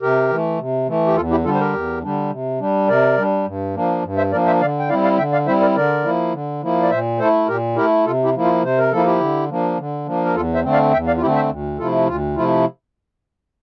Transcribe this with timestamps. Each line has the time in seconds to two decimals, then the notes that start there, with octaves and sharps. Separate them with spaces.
0.02 C3 G4 A#4
0.30 E3 A3
0.59 C3
0.88 E3 A3
1.07 G4
1.16 E2 F4 A4
1.31 E4 G4
1.44 D3 G3 D4 F4 A4
1.55 C5
1.60 G4 A#4
1.74 E2
2.02 D3 G3 D4
2.31 C3
2.60 G3 D4
2.88 C3 A#4 D5
3.17 G3 D4
3.46 G2
3.75 F3 A#3 D4
4.03 G2
4.17 C5 E5
4.32 F3 A#3 D4 A#4 D5
4.46 C5 E5
4.61 D3 D5 F5
4.79 G5
4.89 G3 C4 E4 D5 F5
5.04 D5 F5
5.18 D3 E5 G5
5.32 D5 F5
5.47 G3 C4 E4 C5 E5
5.61 A#4 D5
5.75 D3 A#4 D5
6.04 F3 A#3 E4
6.33 D3
6.62 F3 A#3 E4
6.83 D5
6.90 A#2 C5 E5
7.19 A3 E4 A4 C5
7.48 A#2 G4 A#4
7.76 A3 E4 G4 A#4
8.05 C3 F4 A4
8.24 E4 G4
8.34 F3 A#3 E4
8.44 F4
8.62 C3 C5
8.78 A#4
8.91 F3 A#3 E4 A4
9.06 E4 G4
9.20 D3
9.49 F3 A#3 D4
9.78 D3
10.06 F3 A#3 D4
10.25 A#4
10.35 E2 F4 A4
10.54 C5 E5
10.63 D3 A3 C4
10.73 D5 F5
10.93 E2 E5 G5
11.07 D5 F5
11.17 F4
11.21 D3 A3 C4 E4 G4
11.35 C5 E5
11.49 D2
11.79 C3 F3 A3 E4 F4 A4
12.07 D2 F4
12.36 C3 F3 A3 E4 F4